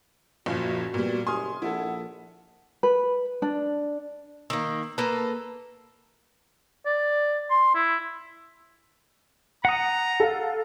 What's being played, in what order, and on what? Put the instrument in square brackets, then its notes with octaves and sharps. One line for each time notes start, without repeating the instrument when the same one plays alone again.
[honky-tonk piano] F#1 A#2 [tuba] F3 [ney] F#4 [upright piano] F5
[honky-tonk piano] A#2 G3 [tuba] B3
[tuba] F#1 [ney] G4 [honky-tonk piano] G#5 [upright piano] C6 D#6 F6
[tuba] A#1 [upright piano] E4 A4 [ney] F#5
[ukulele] B4
D4
[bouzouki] D#3 A#3 [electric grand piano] E6
[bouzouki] A#3 A4 [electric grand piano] B4 A5 A#5
[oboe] D5
C6
E4
[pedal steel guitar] F#5 D#6 [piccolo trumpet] A#5
[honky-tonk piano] A4 F5